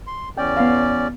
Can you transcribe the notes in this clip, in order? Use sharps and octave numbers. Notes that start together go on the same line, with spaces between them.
C6
E2 C#4 D5 G5
B3 F5